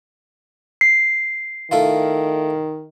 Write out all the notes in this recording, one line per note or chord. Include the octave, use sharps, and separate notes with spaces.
C7
D#3 A3 E4 F4